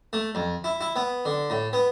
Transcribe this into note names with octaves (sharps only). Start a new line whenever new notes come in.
A3
F2
E4
E4
B3
D3
A2
B3